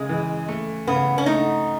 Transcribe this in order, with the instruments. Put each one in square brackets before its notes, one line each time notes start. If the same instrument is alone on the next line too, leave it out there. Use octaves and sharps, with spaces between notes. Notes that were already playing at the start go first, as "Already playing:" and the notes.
Already playing: [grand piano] C#3 [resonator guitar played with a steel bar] G#3
[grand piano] E3
A3
[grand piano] C#3 [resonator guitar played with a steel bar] B3
[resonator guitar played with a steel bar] C#4
[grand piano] A3 [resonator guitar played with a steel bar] D#4